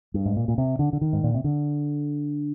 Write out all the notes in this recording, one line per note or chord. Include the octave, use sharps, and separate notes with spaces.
G2
G#2
A#2
A#2
C3
D3
D3
D#3
G#2
A#2
C3
D3